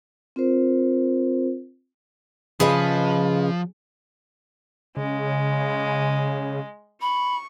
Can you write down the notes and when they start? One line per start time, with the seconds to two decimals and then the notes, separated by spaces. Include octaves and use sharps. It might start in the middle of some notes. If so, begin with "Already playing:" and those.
0.36 C4 F4 A#4 C5
2.60 C#3 F3 G#4 B4 D#5
4.97 C#3 G#3
7.02 B5 C#6